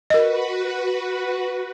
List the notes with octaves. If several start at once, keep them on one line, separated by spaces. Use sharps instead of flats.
F#4 A#4 B4 D#5